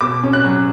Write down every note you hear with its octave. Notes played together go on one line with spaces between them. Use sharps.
B2 D6
C#4
F#6
F#3